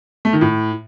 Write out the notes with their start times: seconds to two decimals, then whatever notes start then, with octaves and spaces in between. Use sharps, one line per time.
0.25 A3
0.33 D#3
0.41 A2